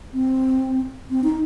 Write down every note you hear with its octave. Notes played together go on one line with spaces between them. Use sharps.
C4
C4
D#4